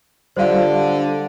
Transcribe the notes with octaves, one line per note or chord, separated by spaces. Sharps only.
D3 G3 F4 C5 F5